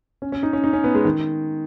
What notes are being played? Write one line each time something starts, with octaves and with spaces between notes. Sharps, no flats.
C#4
C#4
D#4
C#4
D#4
C#4
B3
G#3
D#3